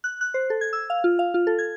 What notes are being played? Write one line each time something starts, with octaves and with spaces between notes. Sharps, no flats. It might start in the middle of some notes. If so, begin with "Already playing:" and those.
F#6
F#6
C5
A4
G#6
E6
F5
F4
F5
F4
A4
G#6